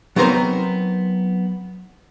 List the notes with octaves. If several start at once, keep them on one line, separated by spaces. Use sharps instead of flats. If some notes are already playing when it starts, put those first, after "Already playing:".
F#3 B3 C4 D#4 A#4 C5